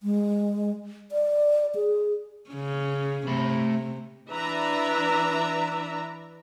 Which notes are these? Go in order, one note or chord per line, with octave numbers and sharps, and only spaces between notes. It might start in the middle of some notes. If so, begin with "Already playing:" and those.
G#3
D5
G#4
C#3 C#4
C3 A3 B5
E3 D4 B4 D5 E5 A#5